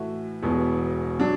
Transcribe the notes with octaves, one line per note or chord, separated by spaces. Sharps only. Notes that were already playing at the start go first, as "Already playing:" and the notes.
Already playing: A2 E3 A3 F#4
E1 E2 B2 B3
F#3 D4